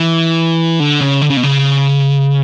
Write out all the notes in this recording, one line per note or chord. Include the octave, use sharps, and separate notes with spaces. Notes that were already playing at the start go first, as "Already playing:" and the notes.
Already playing: E3
D3
C#3
D3
C#3
B2
C#3